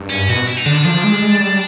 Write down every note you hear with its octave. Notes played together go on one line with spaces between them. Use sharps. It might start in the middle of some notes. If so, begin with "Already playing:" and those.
Already playing: G2
C#4
B2 F#4
E4
D#4
D3 D4
F3 D4
G#3
G#3
G3